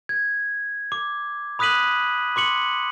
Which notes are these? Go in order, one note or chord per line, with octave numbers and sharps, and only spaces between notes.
G#6
D6
B5 D#6 F#6 B6 D#7 F#7
C6 D6 C#7 F#7